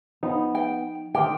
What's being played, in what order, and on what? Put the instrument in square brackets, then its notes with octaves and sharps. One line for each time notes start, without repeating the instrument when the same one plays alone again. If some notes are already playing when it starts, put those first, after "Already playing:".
[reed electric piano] F3 D#4 [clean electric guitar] B3
[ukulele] G5
[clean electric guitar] D#3 C4 G4 [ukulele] G5